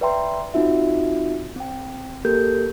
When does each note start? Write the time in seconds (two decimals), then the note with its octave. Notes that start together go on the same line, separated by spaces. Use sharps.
0.01 B4 D5 E5 G5 A#5 C6
0.54 C4 D#4 F4 F#4 E5
1.56 C4 G5
2.25 A#3 G4 A4 A#4 G6